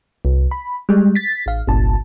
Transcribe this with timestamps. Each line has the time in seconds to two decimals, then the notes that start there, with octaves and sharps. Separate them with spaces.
0.25 C2
0.51 B5
0.89 G3 G#3
1.15 A6 B6
1.46 A1 F5
1.67 G1 C2 A#2 A5